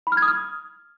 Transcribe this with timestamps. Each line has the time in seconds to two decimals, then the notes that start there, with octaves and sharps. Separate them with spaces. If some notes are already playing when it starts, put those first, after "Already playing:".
0.07 B5
0.12 F6
0.17 G#6
0.22 D#6
0.28 F6